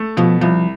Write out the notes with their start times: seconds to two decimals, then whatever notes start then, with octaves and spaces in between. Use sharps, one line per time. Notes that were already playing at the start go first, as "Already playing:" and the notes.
Already playing: A3
0.17 B2 F3
0.41 C2 F3